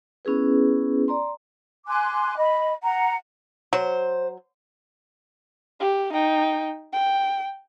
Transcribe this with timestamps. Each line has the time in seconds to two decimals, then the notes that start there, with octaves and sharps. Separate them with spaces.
0.25 B3 C#4 E4 G#4 B4
1.08 D5 A#5 C6
1.88 G#5 C6 D6 F#6
2.38 D#5 B5
2.83 F#5 A#5
3.73 F#3 C5
5.80 G4
6.13 D#4 G5
6.93 G5